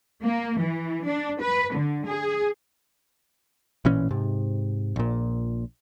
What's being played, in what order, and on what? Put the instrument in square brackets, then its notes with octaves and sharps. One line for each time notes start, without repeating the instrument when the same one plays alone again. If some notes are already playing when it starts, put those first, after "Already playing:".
[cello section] A#3
E3
D4
B4
D3
G#4
[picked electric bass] A1 A#2 E3 C#4
G#2 C3
A#1 A#2